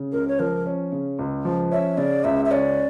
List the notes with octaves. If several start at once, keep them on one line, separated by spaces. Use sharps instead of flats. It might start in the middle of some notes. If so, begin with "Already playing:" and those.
Already playing: C#3
C#2 A#4
C#5
F3 A#4
C#4
C#3
C#2
F3
C#4 E5
C#3 D5
C#2 E5
E5
C#4 D5